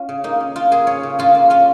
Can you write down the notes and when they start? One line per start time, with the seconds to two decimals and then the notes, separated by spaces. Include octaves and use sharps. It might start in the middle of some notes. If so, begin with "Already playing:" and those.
Already playing: C#4 F4
0.09 C#3
0.24 A#3 D#4
0.40 C#4
0.56 C#3 F4
0.72 A#3 G#4
0.87 C#4 C#5
1.03 C#3
1.19 C#3 F4
1.35 A#3
1.50 C#4 F4